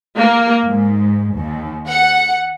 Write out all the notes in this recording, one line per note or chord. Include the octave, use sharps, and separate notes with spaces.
A#3
G#2
D#2
F#5